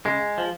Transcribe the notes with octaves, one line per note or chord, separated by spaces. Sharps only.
C#3 G#3
F3